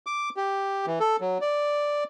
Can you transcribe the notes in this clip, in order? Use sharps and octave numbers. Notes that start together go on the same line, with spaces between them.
D6
G4
E3
A4
F#3
D5